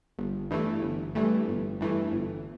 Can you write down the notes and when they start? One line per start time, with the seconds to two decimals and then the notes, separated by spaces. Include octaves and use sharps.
0.18 G1
0.50 G2 E3 A3
0.83 G1
1.15 G2 E3 A3
1.48 G1
1.81 G2 E3 A3
2.12 G1